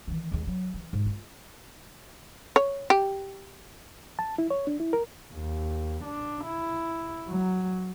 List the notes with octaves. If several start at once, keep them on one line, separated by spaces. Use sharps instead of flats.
D#3 E3
D#2 G#3
F#3
E3
G#2
F4
C#5
G4
A5
E4
C#5
D4
E4
A#4
D#2
D4
E4
F#3